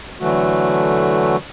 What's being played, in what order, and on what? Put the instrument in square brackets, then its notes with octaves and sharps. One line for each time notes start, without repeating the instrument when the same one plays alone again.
[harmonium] D3 E3 F#3 A3 F#4